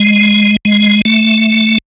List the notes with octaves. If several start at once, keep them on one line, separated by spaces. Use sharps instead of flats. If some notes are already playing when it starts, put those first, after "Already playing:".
Already playing: G#3
G#3
A3